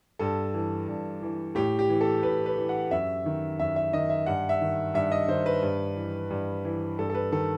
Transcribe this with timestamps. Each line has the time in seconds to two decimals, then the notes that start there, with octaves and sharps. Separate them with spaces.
0.19 G2 A4
0.54 E3
0.88 G2
1.22 E3
1.55 A2 G4
1.79 G4
1.89 E3
2.01 A4
2.23 A2 B4
2.46 B4
2.57 E3
2.69 F#5
2.91 F#2 E5
3.26 D#3
3.59 F#2 E5
3.76 E5
3.93 D#3 D#5
4.10 E5
4.26 G2 F#5
4.49 E5
4.61 D#3
4.94 G2 E5
5.12 D#5
5.28 D#3 C5
5.46 B4
5.63 G2
5.96 E3
6.30 G2
6.65 E3
6.99 G2 A4
7.10 A4
7.15 B4
7.32 D#3 A4